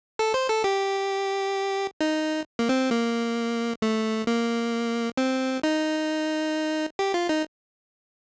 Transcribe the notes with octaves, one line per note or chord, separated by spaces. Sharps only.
A4
C5
A4
G4
D#4
A#3
C4
A#3
A3
A#3
C4
D#4
G4
F4
D#4